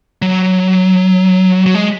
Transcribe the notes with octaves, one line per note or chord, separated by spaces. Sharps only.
F#3
F#3
G#3